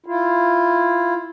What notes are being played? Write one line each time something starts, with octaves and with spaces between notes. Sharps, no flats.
E4 F4